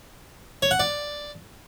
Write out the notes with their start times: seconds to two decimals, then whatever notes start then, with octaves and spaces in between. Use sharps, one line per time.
0.62 C#5
0.71 F#5
0.80 D5